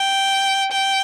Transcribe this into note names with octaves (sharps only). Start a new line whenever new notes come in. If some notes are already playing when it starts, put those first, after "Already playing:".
Already playing: G5
G5